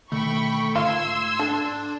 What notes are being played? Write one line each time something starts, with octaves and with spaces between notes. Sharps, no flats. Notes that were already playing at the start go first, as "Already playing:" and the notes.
B2 D3 D#3 A3 G5 B5 C#6
G#2 F4 C6 E6 G#6
D4 A4